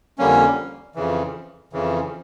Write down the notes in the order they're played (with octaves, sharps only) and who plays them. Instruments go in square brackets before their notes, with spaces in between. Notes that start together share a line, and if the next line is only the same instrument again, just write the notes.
[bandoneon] F2 D3 G3 A#3 C#4
F2 C#3 E3
F2 C#3 E3